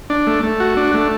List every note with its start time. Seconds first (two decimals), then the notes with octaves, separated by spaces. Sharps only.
0.10 D4
0.27 A3
0.43 A3
0.60 F#4
0.77 D4
0.94 A3